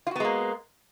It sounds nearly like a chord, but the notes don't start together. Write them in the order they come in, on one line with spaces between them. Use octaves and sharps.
F4 F#4 B3 G#3 A#3